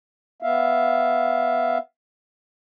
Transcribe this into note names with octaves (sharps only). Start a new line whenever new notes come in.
B3 E5 F5